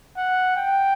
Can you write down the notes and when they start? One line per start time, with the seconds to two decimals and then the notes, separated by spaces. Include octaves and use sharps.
0.17 F#5
0.56 G5